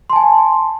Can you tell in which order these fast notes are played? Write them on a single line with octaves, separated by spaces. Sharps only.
C6 A5 G#5